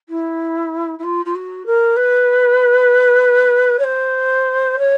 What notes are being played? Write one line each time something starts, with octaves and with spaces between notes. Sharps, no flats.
E4
E4
F4
F4
F#4
A#4
B4
C#5
C5
C#5